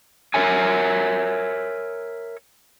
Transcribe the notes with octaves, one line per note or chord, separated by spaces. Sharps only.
A#4 C#5 E5 G#5